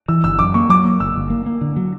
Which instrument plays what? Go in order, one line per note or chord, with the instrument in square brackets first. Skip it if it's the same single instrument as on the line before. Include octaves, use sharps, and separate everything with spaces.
[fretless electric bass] E3 [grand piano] E6
[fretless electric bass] G1 [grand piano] E6
[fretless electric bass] F#2 [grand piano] D6
[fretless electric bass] A#3 [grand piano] C#6
[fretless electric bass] F#3 [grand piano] D6
[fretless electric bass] A#3
[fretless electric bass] G1 [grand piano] E6
[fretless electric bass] G1
A#3
A#3
D3
F#3